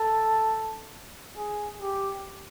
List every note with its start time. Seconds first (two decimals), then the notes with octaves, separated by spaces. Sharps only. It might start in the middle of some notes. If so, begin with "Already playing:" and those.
Already playing: A4
1.37 G#4
1.82 G4